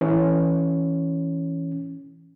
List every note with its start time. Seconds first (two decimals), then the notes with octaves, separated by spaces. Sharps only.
0.01 E3 C#4